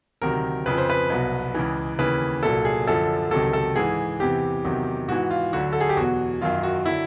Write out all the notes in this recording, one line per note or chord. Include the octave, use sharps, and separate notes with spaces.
D2 C3 D#3 F#3 A#4
F2 C#3 F3 B4
C5
B4
C2 B2 F#3
C#2 C#3 E3
D#2 C#3 E3 B4
C2 A#2 F#3 A4
G#4
F#2 D3 F3 A4
C#2 C3 D#3 F#3 A4
A4
G#2 E3 G#4
E2 C3 E3 G4
E2 C3 D#3 F#3
G#2 E3 F#4
F4
D2 D3 F#3 F#4
A4
G#4
G4
E2 B2 F#3 F#4
F#2 D#3 F#3 F4
F#4
D3 F#3 E4